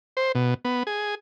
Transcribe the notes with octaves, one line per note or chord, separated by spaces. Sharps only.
C5
B2
B3
G#4